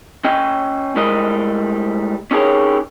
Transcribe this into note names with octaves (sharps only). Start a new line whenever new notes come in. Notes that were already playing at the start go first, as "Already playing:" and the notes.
C#4 D#5 G5
A2 G3 G#3 A#4 D#5
C#4 D#4 G4 G#4 A#4 C#5